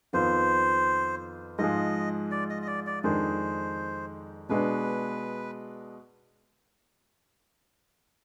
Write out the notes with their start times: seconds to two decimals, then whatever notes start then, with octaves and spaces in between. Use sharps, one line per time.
0.13 F2 D#3 B3 F4 C5
1.58 G#2 F3 G#3 D#5
2.31 D5
2.50 D#5
2.62 D#5
2.67 D5
2.87 D5
3.04 F2 D#3 G#3 D4 C5
4.49 B2 G#3 B3 D4 B4